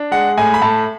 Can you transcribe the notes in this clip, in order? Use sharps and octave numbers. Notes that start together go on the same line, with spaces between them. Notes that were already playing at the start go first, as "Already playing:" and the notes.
Already playing: D4
G#3 F#5
A2 G#5
B5
A2 A5